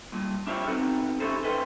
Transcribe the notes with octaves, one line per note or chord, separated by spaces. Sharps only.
G2 A#2
D4 E4 F4 G4 C5 C#5
B3 C4 D#4 F#4 A4
C#4 D#4 E4 G4 A4 C5
A4 B4 C5 D#5 G5